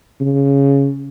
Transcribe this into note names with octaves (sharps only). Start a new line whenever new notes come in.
C#3